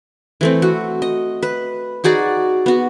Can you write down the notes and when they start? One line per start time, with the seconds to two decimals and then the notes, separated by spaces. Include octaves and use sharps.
0.41 E3 A3 C4
0.62 F#4
1.02 D#5
1.43 B4
2.04 D#4 F#4 G#4 D5
2.66 B3 F#4